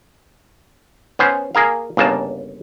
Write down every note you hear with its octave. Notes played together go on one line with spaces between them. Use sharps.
B3 C#4 C5
A#3 G#4 A#4 F5
G1 C#3 A#3 A5